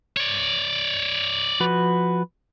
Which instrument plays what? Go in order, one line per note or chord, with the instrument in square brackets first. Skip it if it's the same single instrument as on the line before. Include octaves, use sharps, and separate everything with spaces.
[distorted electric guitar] C#5 D5
[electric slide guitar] F3 F#4 B4